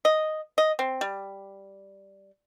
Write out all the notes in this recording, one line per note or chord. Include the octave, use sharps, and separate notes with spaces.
D#5
D#5
C4
G3